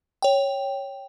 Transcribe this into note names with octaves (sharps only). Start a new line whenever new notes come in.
C#5 G5